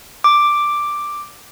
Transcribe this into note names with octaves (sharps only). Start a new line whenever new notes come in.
D6